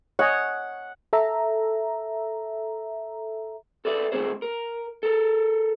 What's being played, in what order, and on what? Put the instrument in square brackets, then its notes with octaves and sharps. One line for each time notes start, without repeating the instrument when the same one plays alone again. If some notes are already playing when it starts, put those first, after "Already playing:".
[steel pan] C#5 D#5 G#5 [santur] F#5
[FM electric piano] A4 E5 A#5
[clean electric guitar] A4 B4 D5 E5
D#3 F3 A3 C4 G#4 C5
A#4
A4 A#4